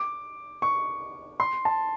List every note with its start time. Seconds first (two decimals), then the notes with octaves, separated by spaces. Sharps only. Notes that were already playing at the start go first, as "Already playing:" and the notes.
Already playing: D6
0.62 C#6
1.40 C6
1.65 A5